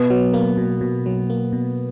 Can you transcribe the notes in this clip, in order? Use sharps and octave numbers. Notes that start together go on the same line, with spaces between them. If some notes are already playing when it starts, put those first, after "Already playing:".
Already playing: B2 B3
F#3
A#3
B2
B2
F#3
A#3
B2